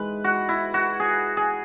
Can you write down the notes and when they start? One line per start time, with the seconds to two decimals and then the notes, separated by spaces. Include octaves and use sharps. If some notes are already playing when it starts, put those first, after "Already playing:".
Already playing: G#2 E3 G#3 B4
0.24 F#4
0.49 E4
0.74 F#4
1.00 G#4
1.37 G#4